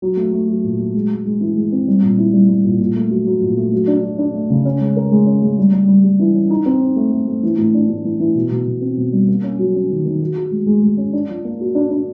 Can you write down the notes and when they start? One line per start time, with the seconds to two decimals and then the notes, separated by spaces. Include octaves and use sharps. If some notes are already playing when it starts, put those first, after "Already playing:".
0.02 F#3
0.17 A3
0.33 A3
0.49 F#3
0.63 A#2
0.79 F#3
0.94 G#3
1.10 G#3
1.25 G#3
1.41 E3
1.56 G#3
1.72 C4
1.88 G3
2.02 A#2
2.18 E4
2.33 G3
2.49 G3
2.65 A#2
2.80 A#2
2.95 A3
3.10 F#3
3.26 F#3
3.42 A#2
3.57 A3
3.72 F#3
3.87 D4
4.04 F#3
4.18 D4
4.33 A3
4.50 C#3
4.65 C#4
4.80 G#3
4.96 A#4
5.11 G#3
5.26 C#4
5.42 G#3
5.58 G3
5.73 G3
5.88 G3
6.04 G3
6.19 E3
6.35 C#4
6.50 D#4
6.66 C4
6.81 D#4
6.96 A3
7.12 A3
7.27 A3
7.43 E3
7.58 A2
7.74 D4
7.89 A2
8.04 E3
8.20 E3
8.35 B2
8.51 B2
8.67 B2
8.81 C4
8.97 B2
9.12 G3
9.28 A#3
9.43 C#4
9.59 F#3
9.75 C#4
9.90 D#3
10.05 D#3
10.21 F#4
10.36 F#4
10.51 G#3
10.66 G#3
10.83 G#3
10.97 C#4
11.13 D4
11.29 F3
11.45 A#3
11.60 F#4
11.75 D4
11.90 D4